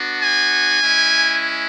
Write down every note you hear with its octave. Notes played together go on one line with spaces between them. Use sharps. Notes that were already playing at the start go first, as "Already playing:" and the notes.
Already playing: B3 D4 F#4
G#5
G#3 C#4 E4